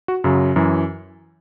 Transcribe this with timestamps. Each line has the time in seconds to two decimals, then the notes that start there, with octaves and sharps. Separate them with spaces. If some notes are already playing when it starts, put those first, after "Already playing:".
0.08 F#4
0.24 F#2 C#3 F#3
0.56 F#2 E3